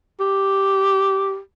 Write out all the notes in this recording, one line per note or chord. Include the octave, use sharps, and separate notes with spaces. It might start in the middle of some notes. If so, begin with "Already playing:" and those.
G4